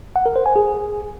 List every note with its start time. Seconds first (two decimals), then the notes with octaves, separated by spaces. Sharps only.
0.16 F#5
0.26 A#4
0.36 C5
0.46 G#5
0.56 G#4